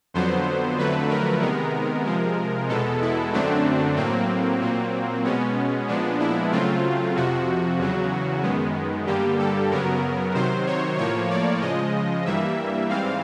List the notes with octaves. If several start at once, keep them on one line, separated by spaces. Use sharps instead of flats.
F2 D3 F#3 B3 C5
F2 D3 F#3 A3 B4
A#4
C3 D#3 G#3 B3
C3 F3 G#3
E2 B2 G#3 B3 A4
E4
F#2 D3 F#3 A3 C4 D4
A2 F#3 A#3 C4
A#2 F#3 A#3
B2 G#3 B3 C#4
A#2 F3 G#3 B3 D4
E4
C#3 F#3 A3 C4 F4
F2 C3 F3 F#4
E2 C#3 F#3
F#2 D#3 G#3 B3
G2 D3 G3 A#3 G4
A4
F#2 C#3 F#3 B3 A#4
C3 D#3 F#3 C5
C#5
A2 F3 A#3 C#5
D5
C#3 F3 G#3 D#5
G2 E3 G3 A#3 E5
G#2 E3 G3 C4 F5